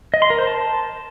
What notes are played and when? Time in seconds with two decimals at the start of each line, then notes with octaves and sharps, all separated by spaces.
0.14 D#5
0.22 C6
0.30 A#4
0.39 C5
0.47 A5